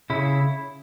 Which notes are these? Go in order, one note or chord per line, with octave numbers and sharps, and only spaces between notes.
C#3 E4